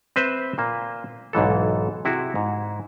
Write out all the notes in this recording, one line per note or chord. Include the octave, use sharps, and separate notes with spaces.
C4 B4 C5 E5
A#2 A#3
B1 G#2 E3 A4
C3 E4 F#4 G#4
G#2